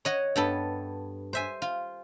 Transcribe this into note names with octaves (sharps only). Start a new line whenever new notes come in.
C#5 D#5 F#5
G2 B3 A4
C5 E5 G#5
F4